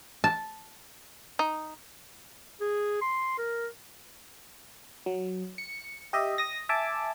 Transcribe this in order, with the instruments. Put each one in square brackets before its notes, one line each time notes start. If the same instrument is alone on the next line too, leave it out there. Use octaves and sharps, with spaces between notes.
[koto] A5
[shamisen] D#4
[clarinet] G#4
C6
A#4
[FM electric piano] F#3
C#7
G4 D#5 E5
D#6 A#6
E5 G#5 A5 D6